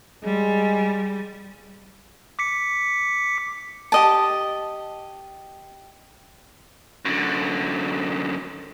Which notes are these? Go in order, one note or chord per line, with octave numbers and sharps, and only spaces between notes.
G3 G#3
D6 B6 C#7
G4 D#5 A5
F#2 D3